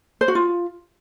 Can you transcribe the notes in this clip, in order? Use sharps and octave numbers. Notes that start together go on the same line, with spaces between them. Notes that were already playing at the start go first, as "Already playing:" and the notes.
C5
F#4
F4